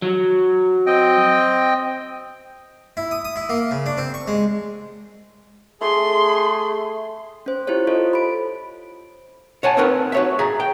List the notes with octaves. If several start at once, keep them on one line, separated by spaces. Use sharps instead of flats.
F#3
C4 D#5 G5
E4
D#6
D#6
E4
A#3
C#3
D4
C4
C#6
G#3
A3 G#4 C6
C#4 C5
E4 F4 G4 C5 C#5
F4 A4 C5 C#5 D#5
B5 D7
C#5 F#5 G#5 A5
C4 D#4 A#4 B4
F#4 C#5 E5
G#4 E5 A#5
G5